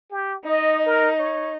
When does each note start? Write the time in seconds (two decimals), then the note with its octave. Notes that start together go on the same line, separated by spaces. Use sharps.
0.11 G4
0.45 D#4 D#5
0.86 A#4
1.19 C#5